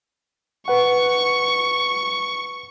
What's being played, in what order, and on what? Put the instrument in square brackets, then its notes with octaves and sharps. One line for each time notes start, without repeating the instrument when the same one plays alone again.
[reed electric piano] B4 F#5 [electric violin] C#6